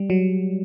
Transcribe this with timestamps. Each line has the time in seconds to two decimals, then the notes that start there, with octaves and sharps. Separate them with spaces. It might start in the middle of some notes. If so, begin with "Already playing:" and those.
Already playing: G3
0.10 F#3